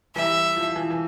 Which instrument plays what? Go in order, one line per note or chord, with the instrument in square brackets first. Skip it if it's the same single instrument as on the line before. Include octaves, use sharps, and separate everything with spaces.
[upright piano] E3 G3 [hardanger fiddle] E5
[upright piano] F3
F3
E3
E3